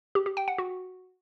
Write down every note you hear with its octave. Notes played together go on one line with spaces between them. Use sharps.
G4
G4
G5
F#5
F#4